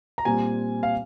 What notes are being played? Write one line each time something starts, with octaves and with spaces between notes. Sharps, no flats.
A#5
A#2 G3 C4 G#5
F5